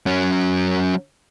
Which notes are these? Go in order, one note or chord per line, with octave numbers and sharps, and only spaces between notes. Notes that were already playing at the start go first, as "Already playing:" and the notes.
F#3 C#4